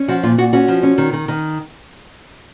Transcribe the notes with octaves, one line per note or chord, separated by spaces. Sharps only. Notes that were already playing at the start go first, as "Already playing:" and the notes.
Already playing: C#4
F3 F#4
A#2 F4
A#2 F#4
C#4 F#4
F3
C#4
D#3
D#3
D#3